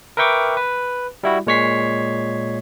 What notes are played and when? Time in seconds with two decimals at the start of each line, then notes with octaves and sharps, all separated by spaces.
0.17 A#4 B4 E5 G5 C#6 D6
0.57 B4
1.23 G3 E4 F#4
1.47 A#2 G#3 C#5 C#6 B6 C7